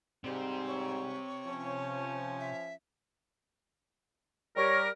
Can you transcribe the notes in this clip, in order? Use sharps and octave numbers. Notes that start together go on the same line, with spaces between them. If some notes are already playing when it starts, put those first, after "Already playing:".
G#2 C3 G3
C#5
F3 C#4
E5
G3 G4 A#4 C#5